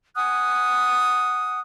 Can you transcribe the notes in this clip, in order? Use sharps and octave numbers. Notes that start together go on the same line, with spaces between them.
F#5 G#5 D#6 F#6